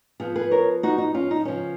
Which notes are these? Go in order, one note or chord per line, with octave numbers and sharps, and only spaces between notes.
F3 B3 F4 G#4
G#4 B4
A#4 C#5
D#4 F#4
D#4
C#4 F4
D#4
C#3 F3 B3 C#4